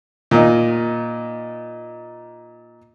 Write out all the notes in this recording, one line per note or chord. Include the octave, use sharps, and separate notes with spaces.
A#2 D#4